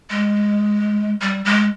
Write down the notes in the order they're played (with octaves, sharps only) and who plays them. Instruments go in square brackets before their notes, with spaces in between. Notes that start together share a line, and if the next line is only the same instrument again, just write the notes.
[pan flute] G#3
G3
G#3